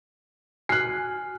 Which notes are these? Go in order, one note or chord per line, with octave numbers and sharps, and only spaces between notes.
F#4 G#5 F6 F#6 C7